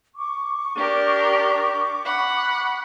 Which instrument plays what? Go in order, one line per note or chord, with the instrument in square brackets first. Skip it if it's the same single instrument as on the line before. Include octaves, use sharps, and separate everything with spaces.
[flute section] C#6 D6
[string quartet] D4 G4 A#4
F#5 B5